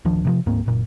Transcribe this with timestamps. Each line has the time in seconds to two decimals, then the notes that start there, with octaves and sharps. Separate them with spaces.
0.05 D1 D#3 F3 D4
0.25 C3 D#3 F3
0.46 D1 G#2 A#3 C4
0.66 F#1 A#2